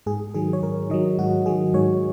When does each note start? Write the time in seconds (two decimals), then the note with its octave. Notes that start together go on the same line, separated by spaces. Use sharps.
0.06 G#2 G#4
0.34 D#3 F#3 G#4
0.53 C#5
0.62 G#2 A#4
0.90 D#3 F#3 D#5
1.18 G#2 F#4
1.46 D#3 F#3 G#4
1.74 G#2 C#5